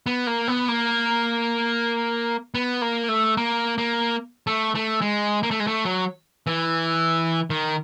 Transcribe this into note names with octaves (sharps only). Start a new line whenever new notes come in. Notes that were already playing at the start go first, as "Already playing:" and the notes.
B3
A#3
B3
A#3
B3
A#3
A3
A#3
A#3
A3
A3
G#3
A#3
A3
G#3
A3
F#3
E3
D#3